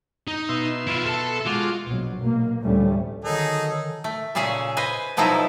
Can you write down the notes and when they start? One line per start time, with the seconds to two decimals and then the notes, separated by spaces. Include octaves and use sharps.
0.27 D#4
0.49 B2 E5 C6
0.88 E4 F4
1.07 A4 A5
1.46 G#3 F4 F#4 D6
1.87 A#1 B2 F#3
2.21 B2 A#3
2.63 D2 A2 F3 G3 A3 C#4
3.24 D3 D#3 F#3 D#4 G#4 A4
4.04 A3
4.35 A#2 C#3 C#4 G#4 E5
4.77 B4 C5 D#5 G#5
5.17 B2 F3 F#3 D#4 E4 A4